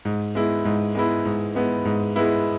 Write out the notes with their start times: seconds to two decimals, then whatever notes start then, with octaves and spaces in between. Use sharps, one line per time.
0.05 G#2
0.35 G#3 B3 E4
0.65 G#2
0.95 G#3 B3 E4
1.25 G#2
1.55 G#3 B3 E4
1.85 G#2
2.16 G#3 B3 E4